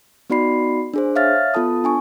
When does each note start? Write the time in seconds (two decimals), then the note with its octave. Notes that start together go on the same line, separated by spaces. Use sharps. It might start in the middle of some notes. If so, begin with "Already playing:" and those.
0.30 B3 D#4 F#4 D5 B5 C7
0.94 D4 G#4 C5
1.16 C#5 E5 F5 F6 A6
1.54 B3 F4 A4 A5 D#6
1.84 D4 G#5 C#6